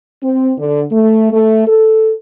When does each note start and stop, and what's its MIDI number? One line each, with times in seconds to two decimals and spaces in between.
0.22 0.51 60
0.58 0.82 50
0.91 1.31 57
1.32 1.66 57
1.67 2.12 69